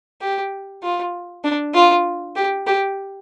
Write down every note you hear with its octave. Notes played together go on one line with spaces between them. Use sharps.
G4
F4
D4
F4
G4
G4